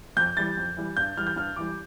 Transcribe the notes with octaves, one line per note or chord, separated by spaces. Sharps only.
F2 G6
E3 G3 A6
F2
E3 G3
G2 G6
E3 G3 F6
G6
G2 F6
E3 G3 D6